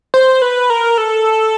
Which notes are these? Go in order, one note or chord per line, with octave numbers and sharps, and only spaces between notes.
C5
B4
A#4
A4